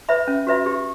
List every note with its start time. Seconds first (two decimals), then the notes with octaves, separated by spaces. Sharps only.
0.09 B4 E5 B5
0.28 C#4
0.47 F#4 B4 E5 B5
0.66 G4